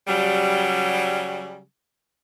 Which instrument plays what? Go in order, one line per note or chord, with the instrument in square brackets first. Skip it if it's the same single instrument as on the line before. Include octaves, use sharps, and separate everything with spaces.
[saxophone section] C#3 F#3 G3